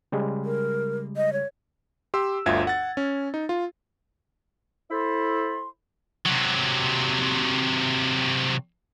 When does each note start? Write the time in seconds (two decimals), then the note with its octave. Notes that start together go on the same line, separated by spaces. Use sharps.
0.12 C#3 G3 G#3
0.45 A#4
1.17 D#5
1.33 C#5
2.14 G4 C6 E6
2.46 G1 D2 F4 E5 G#6
2.67 F#5 A6
2.97 C#4
3.34 D#4
3.49 F4
4.91 E4 A4 C5 B5 C6
6.25 C3 F#3